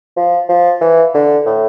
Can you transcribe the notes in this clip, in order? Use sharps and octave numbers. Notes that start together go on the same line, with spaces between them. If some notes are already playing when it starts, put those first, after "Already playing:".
F3
F3
E3
D3
A2